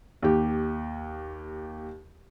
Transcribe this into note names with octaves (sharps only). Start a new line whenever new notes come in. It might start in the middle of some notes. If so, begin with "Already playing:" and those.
D#2 G4